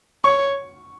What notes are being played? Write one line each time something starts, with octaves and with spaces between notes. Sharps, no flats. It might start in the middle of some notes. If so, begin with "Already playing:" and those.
C#5 C#6